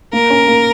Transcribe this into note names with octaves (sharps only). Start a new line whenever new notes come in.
A#3 A#4
C#4
A#3